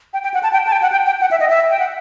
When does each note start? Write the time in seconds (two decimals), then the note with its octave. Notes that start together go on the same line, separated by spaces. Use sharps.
0.13 G5
0.24 G5
0.34 F#5
0.43 A5
0.53 G5
0.67 A5
0.72 G5
0.82 F#5
0.92 G5
1.07 G5
1.21 F#5
1.31 E5
1.40 D#5
1.50 E5
1.70 G5
1.79 F#5